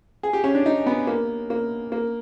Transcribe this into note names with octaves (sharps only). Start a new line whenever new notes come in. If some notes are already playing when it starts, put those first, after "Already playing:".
G#4
G4
C#4
D4
D#4
B3
A#3
A#3
A#3